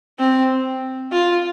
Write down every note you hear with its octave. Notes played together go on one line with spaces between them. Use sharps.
C4
F4